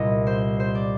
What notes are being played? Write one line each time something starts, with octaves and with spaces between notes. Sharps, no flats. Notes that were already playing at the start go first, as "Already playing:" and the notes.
Already playing: C2 A#2 D#5
C5
C5
D5